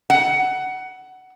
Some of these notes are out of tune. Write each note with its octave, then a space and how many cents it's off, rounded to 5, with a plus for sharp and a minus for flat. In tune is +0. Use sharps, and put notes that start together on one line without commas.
F#5 +15